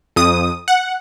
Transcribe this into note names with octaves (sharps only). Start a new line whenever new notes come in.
F2 D#6
F#5